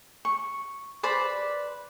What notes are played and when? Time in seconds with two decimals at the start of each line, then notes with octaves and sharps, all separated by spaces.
0.25 C#6
1.03 B4 C5 D5 B5